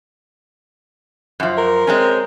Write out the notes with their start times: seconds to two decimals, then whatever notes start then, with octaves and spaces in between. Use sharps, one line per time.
1.40 F#2 F3
1.58 A#4
1.87 G#3 C4 C#4